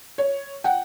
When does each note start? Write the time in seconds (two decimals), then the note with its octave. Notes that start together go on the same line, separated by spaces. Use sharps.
0.18 C#5
0.64 F#5 G5